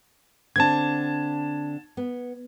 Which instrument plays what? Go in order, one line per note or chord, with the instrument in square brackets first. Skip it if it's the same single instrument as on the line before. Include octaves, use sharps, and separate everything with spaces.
[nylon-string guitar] D3 C4 D4 [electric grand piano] A5 G#6
[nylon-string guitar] B3